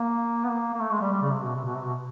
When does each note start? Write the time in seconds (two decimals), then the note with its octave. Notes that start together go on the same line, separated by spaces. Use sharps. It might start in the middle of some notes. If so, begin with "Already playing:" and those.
Already playing: A#3
0.44 B3
0.49 A#3
0.74 A#3
0.80 A3
0.91 G#3
1.01 G3
1.12 G3
1.22 C#3
1.33 C3
1.44 B2
1.55 C3
1.65 B2
1.75 C3
1.84 B2